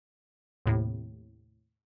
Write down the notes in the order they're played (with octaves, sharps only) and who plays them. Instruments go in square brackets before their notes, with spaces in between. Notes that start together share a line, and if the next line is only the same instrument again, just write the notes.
[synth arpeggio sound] D#2 A2 C3